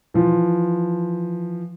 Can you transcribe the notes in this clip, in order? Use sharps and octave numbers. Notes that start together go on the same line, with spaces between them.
E3 F3